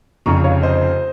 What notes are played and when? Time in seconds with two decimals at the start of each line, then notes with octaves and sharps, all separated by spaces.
0.26 F1 F2 C#3 A#5 C#6
0.44 C#5 F5
0.63 C5 D#5